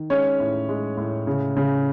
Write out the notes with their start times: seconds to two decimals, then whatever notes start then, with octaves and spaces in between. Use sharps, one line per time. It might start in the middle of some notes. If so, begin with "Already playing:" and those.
Already playing: D#3
0.10 G#3 C#4 C#5
0.40 A2
0.69 G#3
0.97 A2
1.27 C#3
1.57 C#3